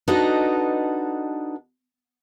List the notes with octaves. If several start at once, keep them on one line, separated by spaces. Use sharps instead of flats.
D4 D#4 F#4 A4 B4 D#5